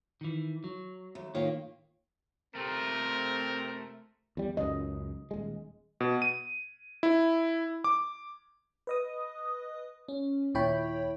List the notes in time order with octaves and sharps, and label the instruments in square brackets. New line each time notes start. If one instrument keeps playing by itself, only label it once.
[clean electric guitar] D#3 E3
F#3
[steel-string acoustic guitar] D#2 A3
[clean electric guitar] A2 D#3 A#3 [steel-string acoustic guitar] F4 C#5 G5
[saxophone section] C3 C4 [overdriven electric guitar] A3 F4 [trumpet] A#4
[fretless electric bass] E2 G3
[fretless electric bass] C#2 F#2 [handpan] D#5
[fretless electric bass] D#1 G#3
[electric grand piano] B2
D#7
E4
D6
[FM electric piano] B4 D#5 D#6
C#4
D#2 A#2 E4 C#5 G5 B5